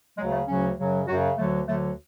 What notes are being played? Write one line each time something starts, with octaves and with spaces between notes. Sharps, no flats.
D2 C#3 F#3 G#3
A3
D2 C#3 F#3 C#4
F#2 C#3 F#3
F#2 C#3 F#3 F#4
D2 D3 F#3 A3
D2 D3 F#3 A3